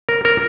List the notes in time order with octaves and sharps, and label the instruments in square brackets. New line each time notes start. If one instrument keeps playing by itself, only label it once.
[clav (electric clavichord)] A#4
A#4